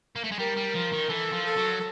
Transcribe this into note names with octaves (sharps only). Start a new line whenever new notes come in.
A#3
A3
G#3
G3 A#4
G3
F3
D#3
E3 A4
F3
A4
F#3